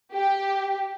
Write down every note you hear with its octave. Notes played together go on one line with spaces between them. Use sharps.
G4